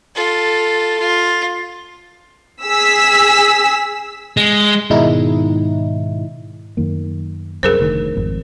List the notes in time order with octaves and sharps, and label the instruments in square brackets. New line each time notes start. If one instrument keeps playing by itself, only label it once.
[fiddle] F4 A4
F4
[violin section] G#4 E6 B6
[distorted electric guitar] G#3
[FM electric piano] G#2 B2 D#3 G#3 D#4 E4
[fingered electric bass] F#2 D#3 A#3
[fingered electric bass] C2 F#2 [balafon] G#4 A#4 C5
[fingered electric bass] F1 D2 D#3
G#1 F2